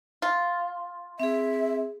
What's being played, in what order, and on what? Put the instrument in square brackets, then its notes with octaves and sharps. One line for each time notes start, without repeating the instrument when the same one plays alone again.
[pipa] F4
[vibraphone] C4 G#4 [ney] E5